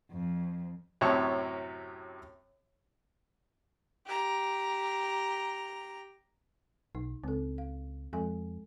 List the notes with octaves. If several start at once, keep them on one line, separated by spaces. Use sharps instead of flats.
F2
F#2 A2 C3 C#5 A5
G4 A#5
B1 D#4
C#2 C4 A4
F5
F2 G#3 A4 G#5